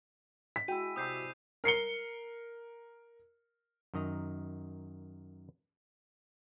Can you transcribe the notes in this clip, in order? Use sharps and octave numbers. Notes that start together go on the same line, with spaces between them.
B6
G#3 E4 F#4 G5 D#7
C3 D5 A#5 D#6 G6 C7
A#4 C7 C#7 G7
F#2 D#3 D#5 A#5